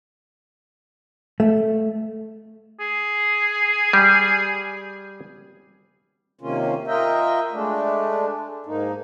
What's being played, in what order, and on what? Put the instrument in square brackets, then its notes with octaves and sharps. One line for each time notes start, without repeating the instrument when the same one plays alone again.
[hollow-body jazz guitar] A3
[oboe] G#4
[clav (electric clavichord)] G3 G4
[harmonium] C3 D#3 A#3 C#4 F4
F4 A#4 D#5 E5 G5
G#3 A3 D4
G#2 A#3 D#4